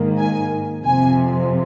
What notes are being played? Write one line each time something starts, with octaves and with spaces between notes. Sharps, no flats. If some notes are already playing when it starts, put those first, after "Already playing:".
Already playing: G#2 D#3 A#3
G#5
F2 C3 F3 G#5